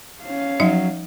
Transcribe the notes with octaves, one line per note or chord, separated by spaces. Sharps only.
C#4 F5
F3 F#3 D#4 E5